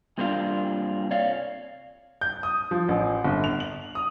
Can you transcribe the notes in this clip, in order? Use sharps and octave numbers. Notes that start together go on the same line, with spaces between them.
G2 C3 A#3 C4 D4 F4
C#5 D5 F5
G6
D#6
F3
A1
G1
F7
F#7
D#6